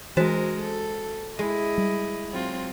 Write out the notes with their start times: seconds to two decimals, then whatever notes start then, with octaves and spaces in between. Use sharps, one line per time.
0.17 E3 G#3 D4 F#4 A#4 C5 A5
0.61 A4
1.39 G#3 E4 D#5
1.78 G3
2.31 F#3 C4 F4